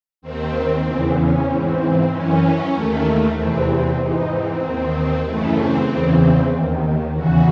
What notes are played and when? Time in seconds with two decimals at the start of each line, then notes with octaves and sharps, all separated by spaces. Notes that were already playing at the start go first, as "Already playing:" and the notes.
0.22 D#2 D#3 C4
0.85 E2 C#3 E3
1.16 C#4
1.47 G#2 E3 C4
2.10 F#2 E3 C#4
2.74 D#2 D#3 A3
3.36 E2 C3 E3 C4
3.68 C4
3.99 G#2 E3 D#4
4.31 C4
4.62 D#2 D#3
5.25 F#2 C#3 E3 A3
5.57 C4
5.88 E2 C#3 E3
6.51 D#2 D#3
7.14 E2 C#3 E3 F#4